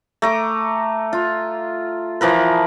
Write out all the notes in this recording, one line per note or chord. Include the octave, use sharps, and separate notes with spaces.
A3 A#5 D6
F4
E3 F3 A#4 B4